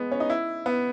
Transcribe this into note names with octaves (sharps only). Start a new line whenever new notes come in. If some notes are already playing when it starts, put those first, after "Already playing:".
Already playing: G#3 B3
C#4
D#4
E4
B3